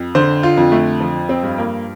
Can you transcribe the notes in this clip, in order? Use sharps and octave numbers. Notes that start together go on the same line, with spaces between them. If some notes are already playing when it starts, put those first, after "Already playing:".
Already playing: F2
D3 C5
F4
F2
A3
F3
C4
G2
A#3